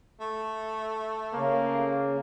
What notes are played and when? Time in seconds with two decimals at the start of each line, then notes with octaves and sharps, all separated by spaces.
0.20 A3
1.33 C#3 A#3